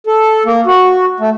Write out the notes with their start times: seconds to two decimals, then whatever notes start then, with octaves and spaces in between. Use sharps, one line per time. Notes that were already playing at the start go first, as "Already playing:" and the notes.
0.07 A4
0.45 A#3
0.66 F#4
1.20 A3